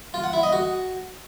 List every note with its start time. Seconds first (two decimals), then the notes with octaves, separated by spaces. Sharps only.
0.14 F4
0.24 F#5
0.33 E4
0.43 D#5
0.53 F#4